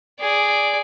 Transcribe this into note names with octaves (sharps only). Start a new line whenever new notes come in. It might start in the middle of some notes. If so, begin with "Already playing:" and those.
G#4 D5